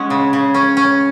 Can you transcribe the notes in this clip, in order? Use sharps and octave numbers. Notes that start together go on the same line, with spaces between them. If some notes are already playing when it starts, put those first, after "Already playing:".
Already playing: G#3 C#4 F#5
C#3
C#3
C#4
C#4